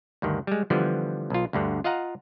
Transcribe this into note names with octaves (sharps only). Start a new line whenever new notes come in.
D2 G2 D#3
G3 G#3
D3 E3 F3 G3 B3
B1 F4
D2 G2 D3
F4 D#5 F5 F#5 A#5